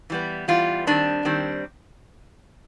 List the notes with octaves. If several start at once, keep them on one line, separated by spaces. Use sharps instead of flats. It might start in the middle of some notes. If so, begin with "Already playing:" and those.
E3 G3 B3
E3 G3 B3 F4
D#3 G3 C4 D4
D#3 G3 C4